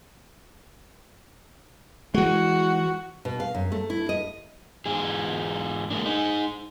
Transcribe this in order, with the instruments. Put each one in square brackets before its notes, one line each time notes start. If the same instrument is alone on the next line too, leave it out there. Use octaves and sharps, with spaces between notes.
[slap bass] E3 G#3 [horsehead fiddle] F#4
[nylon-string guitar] B2
F5
F#2
A3
E4
D#5
[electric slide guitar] E2 G#2 G#4
G#3 A#3 D4
D#4 G#4